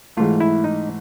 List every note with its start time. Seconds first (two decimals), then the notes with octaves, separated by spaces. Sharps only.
0.17 G#2 E3 A3 F4
0.40 E4
0.64 D#4